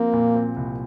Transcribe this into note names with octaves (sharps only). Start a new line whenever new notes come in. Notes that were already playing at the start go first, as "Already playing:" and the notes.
Already playing: F3 A#3 C4
A#2
C4
C2